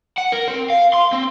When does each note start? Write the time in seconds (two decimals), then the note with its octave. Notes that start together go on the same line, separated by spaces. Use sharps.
0.18 F#5
0.32 A#4
0.48 C4
0.70 F5
0.94 C6
1.13 C4